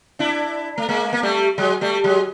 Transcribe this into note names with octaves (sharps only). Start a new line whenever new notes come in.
D4 E4
A3
G#3 A#3
A#3
G3 A3
F#3 G#3
G3 A3
F#3 G#3